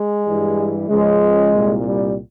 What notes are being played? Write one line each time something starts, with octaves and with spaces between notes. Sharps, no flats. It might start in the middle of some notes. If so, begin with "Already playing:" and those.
Already playing: G#3
G2 E3 G3
C#2 C#3 F3 G#3
C2 A#2 G3
G3